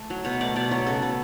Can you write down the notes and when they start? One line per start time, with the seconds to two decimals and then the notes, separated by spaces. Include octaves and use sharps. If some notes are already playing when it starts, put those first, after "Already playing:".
Already playing: A3
0.10 F#3
0.25 B2 C#5
0.41 A3 D5
0.56 B2 D5
0.71 F#3 C#5
0.86 C#3 A4
1.02 B3